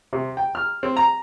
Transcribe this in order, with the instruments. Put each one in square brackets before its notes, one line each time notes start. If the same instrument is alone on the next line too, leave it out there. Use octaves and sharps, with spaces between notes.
[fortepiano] C3
G5
F6
C4
A#5